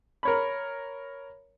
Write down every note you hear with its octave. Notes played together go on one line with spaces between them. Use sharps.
A#4 C#5 B5